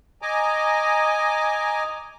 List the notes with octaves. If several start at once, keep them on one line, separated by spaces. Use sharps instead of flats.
D#5 G#5 A#5 D6